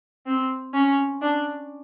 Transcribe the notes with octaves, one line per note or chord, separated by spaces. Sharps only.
C4
C#4
D4